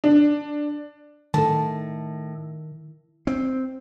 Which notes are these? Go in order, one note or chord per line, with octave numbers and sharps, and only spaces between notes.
D4
A2 D#3 A4 A5
C4